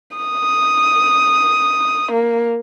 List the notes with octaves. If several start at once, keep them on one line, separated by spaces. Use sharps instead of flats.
D#6
A#3